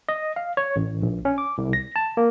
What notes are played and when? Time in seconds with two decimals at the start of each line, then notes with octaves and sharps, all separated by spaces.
0.09 D#5
0.36 F5
0.57 C#5
0.76 A1
1.02 A#1
1.25 C#4
1.38 D6
1.58 C2
1.73 A#6
1.96 A5
2.17 A#3